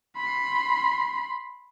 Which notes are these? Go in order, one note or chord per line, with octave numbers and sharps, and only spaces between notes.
B5 C6